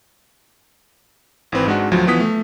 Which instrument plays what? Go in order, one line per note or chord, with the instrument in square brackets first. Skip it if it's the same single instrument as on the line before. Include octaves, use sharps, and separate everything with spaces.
[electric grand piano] G#1 E3 C4 B4
G#2 G#3 D4 F#4
D2 F3 F#3 C5
E3 F3 B3 D#6 B6
A3